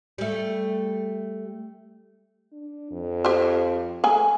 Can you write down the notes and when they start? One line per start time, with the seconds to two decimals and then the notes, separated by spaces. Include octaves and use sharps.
0.18 G3 A3
2.52 D4
2.91 F2
3.25 G4 C5
4.04 A3 G#4 G#5